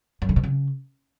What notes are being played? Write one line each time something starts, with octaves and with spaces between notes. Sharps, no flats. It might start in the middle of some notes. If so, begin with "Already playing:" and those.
F#2
D3
B2
C#3